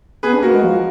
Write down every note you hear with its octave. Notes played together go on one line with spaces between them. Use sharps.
B3 G#4 B4
D4
A#3 F#4 A#4
G#3
F3